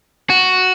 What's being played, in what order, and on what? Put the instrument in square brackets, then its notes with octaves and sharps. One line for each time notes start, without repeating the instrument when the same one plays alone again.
[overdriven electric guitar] F#4